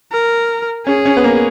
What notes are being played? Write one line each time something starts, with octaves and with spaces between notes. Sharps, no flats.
A#4
C#4 G#4
C#4
B3
A#3